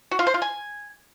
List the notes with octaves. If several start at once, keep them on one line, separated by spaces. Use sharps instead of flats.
F#4
F4
C5
F4
G#5